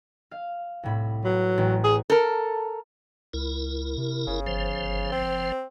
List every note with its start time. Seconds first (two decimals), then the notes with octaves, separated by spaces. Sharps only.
0.31 F5
0.83 C2 A2 B5
1.24 F#3 B4
1.58 A1
1.84 G#4
2.10 A4 A#4
3.33 C#2 E4 A#4
3.97 C3
4.27 G1 C#3
4.46 F#1 F3 C5
5.12 C4